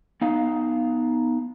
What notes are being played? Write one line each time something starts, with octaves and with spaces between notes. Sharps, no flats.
B3 D#4 F5